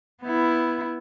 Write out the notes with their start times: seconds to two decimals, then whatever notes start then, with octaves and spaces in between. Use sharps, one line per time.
0.23 B3 E4